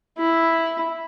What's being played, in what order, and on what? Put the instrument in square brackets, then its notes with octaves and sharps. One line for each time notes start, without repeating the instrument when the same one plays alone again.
[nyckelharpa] E4